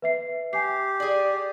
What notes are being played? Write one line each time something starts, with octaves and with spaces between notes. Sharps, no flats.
B4 E5 C7
G4 G#5 C7
G#4 D5